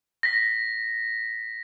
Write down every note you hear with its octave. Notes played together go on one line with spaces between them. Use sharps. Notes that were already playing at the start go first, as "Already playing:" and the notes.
A#6 B6